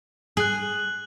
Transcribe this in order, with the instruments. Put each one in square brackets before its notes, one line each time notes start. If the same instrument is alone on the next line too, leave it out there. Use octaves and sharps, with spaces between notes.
[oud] G#4 [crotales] F#6 F#7